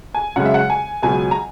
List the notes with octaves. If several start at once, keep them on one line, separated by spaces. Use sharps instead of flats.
G#5
F#2 C#3 G#3 F#5
E5
F#5
G#5
C#2 B2 F#3 G#5
A#5